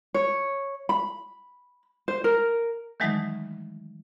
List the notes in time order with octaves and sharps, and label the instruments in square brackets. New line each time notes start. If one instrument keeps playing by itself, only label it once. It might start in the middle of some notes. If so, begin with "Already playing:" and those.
[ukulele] C#5
B5
C5
A#4
[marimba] D#3 E3 F#3 G#3 A3 D#4